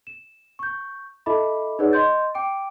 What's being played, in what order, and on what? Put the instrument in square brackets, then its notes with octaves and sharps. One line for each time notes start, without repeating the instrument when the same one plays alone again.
[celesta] E7
C#6 G6
E4 A4 D#5 E5 B5 D6
D#4 G#4 B4 C#5 D5 F#5
D#5 C6 G6 A6
G5 D6 D7